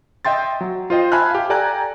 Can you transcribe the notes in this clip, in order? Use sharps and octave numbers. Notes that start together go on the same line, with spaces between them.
D#5 E5 G5 C6 A6
F#3
F4 C5 D#5 G5
E5 G#5 A5 B5 F6 F#6
G4 F5
A4 D5 G5 G#5 A#5 F#6